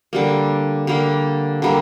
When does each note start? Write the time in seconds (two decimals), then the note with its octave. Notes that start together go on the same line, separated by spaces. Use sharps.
0.13 D3 G3 A#3
0.87 D3 G3 A#3
1.62 D3 G3 A#3